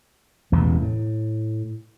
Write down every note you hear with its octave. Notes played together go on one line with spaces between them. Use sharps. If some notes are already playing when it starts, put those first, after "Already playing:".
E1 A1 E2 E3
A2